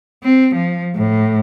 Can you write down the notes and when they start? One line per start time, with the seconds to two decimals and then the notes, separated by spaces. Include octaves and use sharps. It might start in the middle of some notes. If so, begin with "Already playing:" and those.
0.24 C4
0.55 F3
0.96 A2